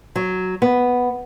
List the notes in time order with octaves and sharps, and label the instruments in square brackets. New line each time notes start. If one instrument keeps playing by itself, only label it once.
[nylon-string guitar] F#3
B3